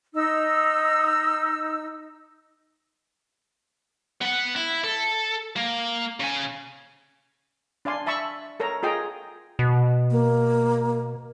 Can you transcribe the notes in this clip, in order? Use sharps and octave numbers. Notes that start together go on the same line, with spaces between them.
D#4 E6
B3 F#5
E4
A4
A#3
C#3 G#5
D4 D5 F5 G#5 C6
E5 A5 B5 C#6 E6
A4 A#4 C#5 A#5
F4 G#4 D#5 G5 A#5
B2
A#3